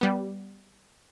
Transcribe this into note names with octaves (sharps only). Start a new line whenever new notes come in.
G3 B3